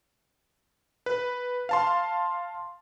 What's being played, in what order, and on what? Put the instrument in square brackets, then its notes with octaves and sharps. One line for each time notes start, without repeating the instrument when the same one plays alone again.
[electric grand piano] B4
F5 A5 C6